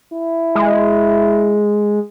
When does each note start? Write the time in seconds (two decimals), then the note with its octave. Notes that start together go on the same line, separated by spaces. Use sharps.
0.14 E4
0.55 G#3